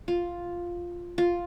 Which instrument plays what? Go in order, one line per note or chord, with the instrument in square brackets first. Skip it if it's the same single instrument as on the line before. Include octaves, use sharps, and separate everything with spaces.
[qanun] F4
F4